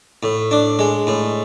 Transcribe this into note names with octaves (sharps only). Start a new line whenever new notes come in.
A2
D4
G#3
A2